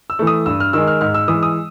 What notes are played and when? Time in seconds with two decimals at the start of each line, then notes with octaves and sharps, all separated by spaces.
0.10 E6
0.19 E3 A3
0.27 D#6
0.46 G2 E6
0.60 F6
0.73 D#3 G#3 E6
0.87 F6
1.01 G#2 F6
1.14 E6
1.28 E3 D#6
1.33 G#3
1.43 D#6